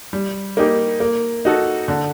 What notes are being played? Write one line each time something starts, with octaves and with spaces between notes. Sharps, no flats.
G3
A#3 D#4 G4
A#3
D#4 F#4 A4
D3